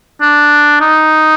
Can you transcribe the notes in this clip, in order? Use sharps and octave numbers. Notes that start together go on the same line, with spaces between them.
D4
D#4